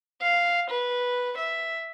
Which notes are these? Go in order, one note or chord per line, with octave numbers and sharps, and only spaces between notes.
F5
B4
E5